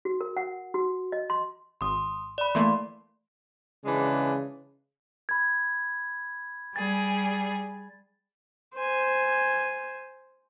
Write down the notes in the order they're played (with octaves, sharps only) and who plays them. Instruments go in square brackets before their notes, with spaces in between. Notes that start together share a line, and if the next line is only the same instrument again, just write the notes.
[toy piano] F#4
A#4
F#5
F#4
D#5
C6
[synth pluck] G#1 [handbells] C6 D#6
[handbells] D5 B5
[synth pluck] E3 A3 A#3 [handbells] C6
[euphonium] C#3 [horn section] E3 G#3 D4
[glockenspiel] B5 G#6
[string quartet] G3 G#4 [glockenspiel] A6
[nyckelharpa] C5 G#5